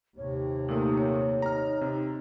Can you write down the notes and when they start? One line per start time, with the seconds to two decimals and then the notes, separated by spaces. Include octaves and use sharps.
0.18 D#2 C3 C#5
0.69 A#2 A3 A#3 D#4 D#6
0.97 C#5
1.42 D#4 A#5 F6
1.81 C3 C4